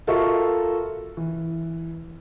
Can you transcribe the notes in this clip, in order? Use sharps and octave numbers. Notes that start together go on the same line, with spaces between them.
F4 F#4 A4 A#4 E5 C#6
E3